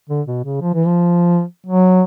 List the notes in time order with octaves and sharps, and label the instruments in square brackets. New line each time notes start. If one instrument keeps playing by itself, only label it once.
[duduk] D3
B2
C#3
F3
E3
F3
F#3